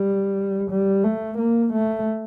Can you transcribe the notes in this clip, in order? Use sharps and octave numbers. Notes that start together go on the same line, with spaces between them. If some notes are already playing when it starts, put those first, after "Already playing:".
Already playing: G3
G3
A3
A#3
A3